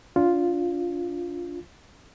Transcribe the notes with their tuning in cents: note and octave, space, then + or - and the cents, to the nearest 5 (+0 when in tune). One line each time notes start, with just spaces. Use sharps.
D4 -25 F4 +0